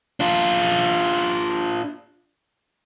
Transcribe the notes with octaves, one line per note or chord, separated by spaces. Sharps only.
D4 F4